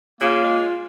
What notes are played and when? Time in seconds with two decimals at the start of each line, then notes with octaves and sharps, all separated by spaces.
0.21 C#3 A#3 F4
0.44 G#3